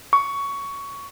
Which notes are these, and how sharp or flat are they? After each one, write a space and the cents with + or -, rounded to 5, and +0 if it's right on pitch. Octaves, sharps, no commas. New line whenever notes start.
C#6 +15